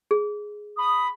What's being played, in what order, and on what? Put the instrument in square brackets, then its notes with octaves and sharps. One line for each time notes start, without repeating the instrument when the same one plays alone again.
[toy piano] G#4
[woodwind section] B5 D#6